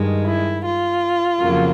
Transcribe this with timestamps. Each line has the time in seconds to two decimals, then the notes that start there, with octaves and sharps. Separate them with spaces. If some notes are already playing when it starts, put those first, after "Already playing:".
Already playing: G2 D#3 G#3
0.26 E4
0.64 F4
1.40 F2 C#3 F#3 A#3